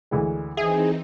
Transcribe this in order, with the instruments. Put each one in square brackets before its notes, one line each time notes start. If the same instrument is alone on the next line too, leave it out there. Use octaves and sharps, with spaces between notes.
[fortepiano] D2 E3 G#3
[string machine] E3 C4 D#4 [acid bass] G#4 [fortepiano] E5